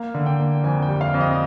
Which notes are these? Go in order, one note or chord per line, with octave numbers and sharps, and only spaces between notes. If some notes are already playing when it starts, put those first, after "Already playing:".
Already playing: A#3 F5
D3
G5
A#3
F2 G#5
G5
G3
F5
F2
D#5